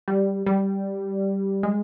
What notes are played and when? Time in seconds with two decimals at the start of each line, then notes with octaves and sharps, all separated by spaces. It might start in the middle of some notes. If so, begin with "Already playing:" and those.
0.08 G3
0.46 G3
1.63 G#3